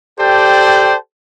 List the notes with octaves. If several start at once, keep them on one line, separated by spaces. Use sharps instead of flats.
G4 A4 C5 D5 G5 A5